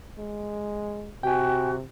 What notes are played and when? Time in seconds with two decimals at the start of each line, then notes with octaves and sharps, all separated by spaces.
0.18 G#3
1.23 C3 F#4 G5 G#5